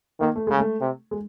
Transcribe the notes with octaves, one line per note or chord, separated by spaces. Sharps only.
D#3 A#3
A3
C#3 G#3
A3
C3
G#3